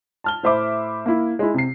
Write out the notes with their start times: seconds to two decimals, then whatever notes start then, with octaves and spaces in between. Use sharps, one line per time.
0.24 A5 F6 G7
0.43 A2 C5 E5 B5 D6
1.06 A#3 E4
1.39 G#3 E4
1.54 C3 C7